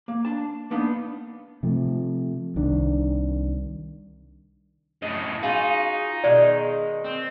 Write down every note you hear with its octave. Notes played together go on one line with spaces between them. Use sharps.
A#3
D4 A5
A#3 B3 D4 D#4
C3 F3 A3
C2 D#3 D4
F#2 A2 D#5
D#4 F4 F#4 G#4
B2 D#3 G#3 D5
C4